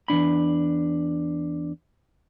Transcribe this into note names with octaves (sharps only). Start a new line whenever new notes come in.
E2 G#2 D4 B5